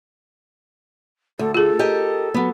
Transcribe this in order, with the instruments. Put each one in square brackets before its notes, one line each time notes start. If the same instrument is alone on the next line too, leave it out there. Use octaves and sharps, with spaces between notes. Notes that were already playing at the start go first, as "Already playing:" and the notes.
[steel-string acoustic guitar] D2 [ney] A4
[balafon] F4 G#4 [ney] A4
[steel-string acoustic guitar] G4 A#4 D#5
F#3 B3